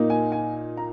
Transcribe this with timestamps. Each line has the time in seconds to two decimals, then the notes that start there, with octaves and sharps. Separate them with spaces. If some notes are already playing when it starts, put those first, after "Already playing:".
Already playing: A#2 A#3 D#4
0.10 G#5
0.32 G#5
0.77 A#5